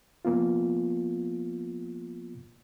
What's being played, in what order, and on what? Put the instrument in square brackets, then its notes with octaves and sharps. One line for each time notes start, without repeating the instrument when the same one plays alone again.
[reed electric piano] F3 A#3 B3 F4